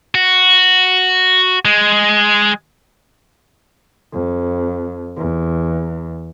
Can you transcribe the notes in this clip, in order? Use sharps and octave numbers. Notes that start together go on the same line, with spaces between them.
F#4
G#3
F2
E2